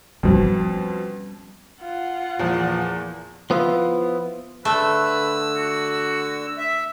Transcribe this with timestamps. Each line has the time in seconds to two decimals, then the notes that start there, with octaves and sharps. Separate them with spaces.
0.23 F2 B2 G3 C#4
1.81 F4 F#5
2.39 E2 A#2 F3
3.50 F3 B3 E4 F4
4.65 D3 A3 B4 E6
5.56 F#4
6.58 E5